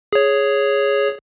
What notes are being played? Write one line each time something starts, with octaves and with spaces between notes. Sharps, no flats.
G#4 C#5